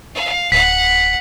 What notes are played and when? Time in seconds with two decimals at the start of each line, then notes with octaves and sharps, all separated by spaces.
0.14 F5
0.52 D1 F#5 B6